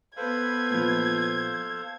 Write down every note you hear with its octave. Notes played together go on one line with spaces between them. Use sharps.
B3 A4 B4 C5 F5 G#6
A#2 F3